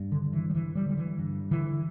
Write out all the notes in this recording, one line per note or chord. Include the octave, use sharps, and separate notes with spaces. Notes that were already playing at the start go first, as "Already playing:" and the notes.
Already playing: G2
D3
D3
E3
G3
G2 E3
G3
D3 G3
E3
G2
D3 E3